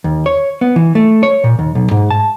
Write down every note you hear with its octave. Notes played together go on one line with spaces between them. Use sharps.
D#2
C#5
B3
E3
A3
C#5
A#2
D#2
B1
G#2
A5